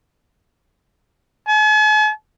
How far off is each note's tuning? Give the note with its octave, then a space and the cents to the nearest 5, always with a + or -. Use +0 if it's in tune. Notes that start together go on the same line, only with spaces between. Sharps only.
G#5 +45